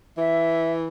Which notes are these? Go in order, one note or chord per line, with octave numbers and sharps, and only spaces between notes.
E3 E5